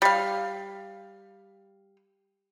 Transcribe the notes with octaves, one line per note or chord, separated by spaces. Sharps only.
G3 F5